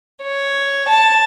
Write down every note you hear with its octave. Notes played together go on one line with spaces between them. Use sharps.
C#5
A5